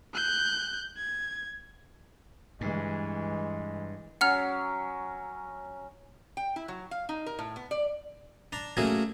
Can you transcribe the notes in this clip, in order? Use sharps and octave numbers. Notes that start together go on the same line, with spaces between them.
F#6 G6
G#6
G2 E3 G#3
F#3 C#4 F#5 F6 F7
G5
E4
F#3
F5
D#4
A#4
A2
B3
D5
D4 A#5
F#3 A3 A#3 C#4 F#4 G#4